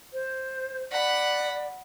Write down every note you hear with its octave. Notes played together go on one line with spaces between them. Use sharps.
C5
D5 F#5 B5